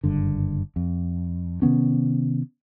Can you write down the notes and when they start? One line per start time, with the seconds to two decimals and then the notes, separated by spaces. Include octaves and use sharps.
0.04 F#1 G2 D3
0.76 F2
1.62 C3 D#3 B3 C#4